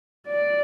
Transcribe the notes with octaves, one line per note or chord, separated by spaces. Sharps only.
D5